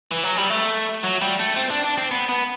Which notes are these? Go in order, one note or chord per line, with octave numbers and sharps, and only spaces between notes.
E3
F#3
G3
A3
F#3
G3
A3
C4
D4
D4
C4
B3
B3